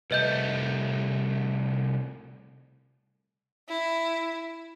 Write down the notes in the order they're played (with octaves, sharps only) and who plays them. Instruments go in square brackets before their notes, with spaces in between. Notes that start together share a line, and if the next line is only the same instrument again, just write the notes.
[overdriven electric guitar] C2 A3 [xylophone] B4 D#5 G6
[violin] E4